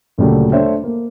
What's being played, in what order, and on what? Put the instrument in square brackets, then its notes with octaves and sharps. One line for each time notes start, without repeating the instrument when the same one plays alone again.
[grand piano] D2 A#2 C#3 F#3 G3 A3
A3 D4 C5 C#5 E5 G5
A#3